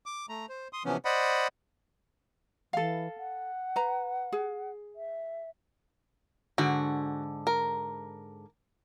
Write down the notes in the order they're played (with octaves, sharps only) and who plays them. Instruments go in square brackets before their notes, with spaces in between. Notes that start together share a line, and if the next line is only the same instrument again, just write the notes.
[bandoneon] D6
A3 A#5
C5
C6 D#6
C3 E3 F3 B3 C#4
C5 D5 D#5 F#5 B5
[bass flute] E3 [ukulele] A4 F5
[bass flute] F#5
[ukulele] B4 A#5
G#4
[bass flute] E5
[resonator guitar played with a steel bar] G#2 D3 [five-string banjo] F#4
[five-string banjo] A#4